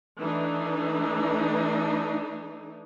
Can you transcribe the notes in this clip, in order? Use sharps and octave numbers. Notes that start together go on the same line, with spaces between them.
E3 A3 D4 D#4